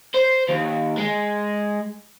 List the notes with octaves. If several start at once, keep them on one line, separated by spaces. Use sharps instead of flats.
C5
D#2
G#3